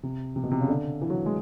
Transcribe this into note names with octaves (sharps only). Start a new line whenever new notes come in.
C3
C3
B2
C3
C#3
D3
E3
F#3
G#3